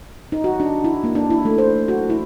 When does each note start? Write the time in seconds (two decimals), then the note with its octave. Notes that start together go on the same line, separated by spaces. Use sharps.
0.32 D#4
0.44 F#4
0.60 D4
0.84 E4
1.04 A#3
1.15 D4
1.30 E4
1.45 A3
1.58 C5
1.88 F#4
2.10 E4